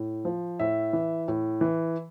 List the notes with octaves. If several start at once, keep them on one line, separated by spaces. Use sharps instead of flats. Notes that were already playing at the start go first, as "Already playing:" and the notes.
Already playing: A2
F3
A2 E5
E3
A2
E3